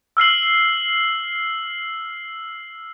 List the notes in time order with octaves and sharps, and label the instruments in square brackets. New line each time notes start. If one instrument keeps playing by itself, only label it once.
[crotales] E6 F6 C7 F#7